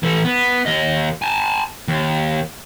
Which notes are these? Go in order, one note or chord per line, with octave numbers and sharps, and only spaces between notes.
E3 A4
B3
D#2 D#5
G#5 A5
D#2